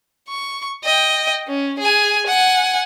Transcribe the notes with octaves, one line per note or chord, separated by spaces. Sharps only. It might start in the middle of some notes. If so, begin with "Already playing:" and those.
C#6
D#5 G5
C#4
G#4 G#5
F#5 G#5